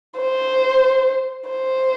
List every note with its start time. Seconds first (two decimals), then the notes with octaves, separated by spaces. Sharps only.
0.20 C5
1.50 C5